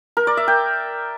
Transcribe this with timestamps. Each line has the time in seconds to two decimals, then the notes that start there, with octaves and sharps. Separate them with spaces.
0.17 A#4
0.27 D5
0.37 E5
0.48 G5